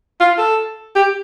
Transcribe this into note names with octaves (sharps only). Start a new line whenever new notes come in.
F4
A4
G4